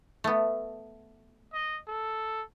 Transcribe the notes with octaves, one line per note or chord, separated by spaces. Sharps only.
A3 B3
D#5
A4